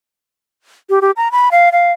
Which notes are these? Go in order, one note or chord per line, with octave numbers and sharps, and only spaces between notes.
G4
G4
A#5
B5
F5
F5